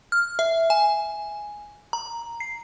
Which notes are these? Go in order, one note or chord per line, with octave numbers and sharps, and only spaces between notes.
F6
E5
G#5
A#5
C7